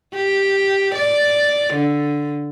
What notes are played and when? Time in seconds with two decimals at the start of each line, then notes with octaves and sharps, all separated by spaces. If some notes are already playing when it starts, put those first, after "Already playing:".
0.14 G4
0.95 D5
1.74 D3